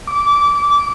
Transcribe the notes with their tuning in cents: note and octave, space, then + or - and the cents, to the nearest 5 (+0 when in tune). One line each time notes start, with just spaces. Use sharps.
D6 -20